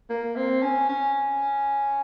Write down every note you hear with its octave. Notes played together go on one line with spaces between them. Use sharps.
A#3
C4
C#4
C#4